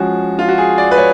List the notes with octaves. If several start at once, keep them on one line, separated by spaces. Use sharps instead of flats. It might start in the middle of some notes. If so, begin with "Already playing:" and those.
Already playing: F3 G#3 C#4 F#4
F4
F#4
G#4
D5
B4
C#5